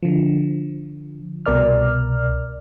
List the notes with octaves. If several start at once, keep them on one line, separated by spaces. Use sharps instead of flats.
D3 F3
C2 B2 A#4 D5 F6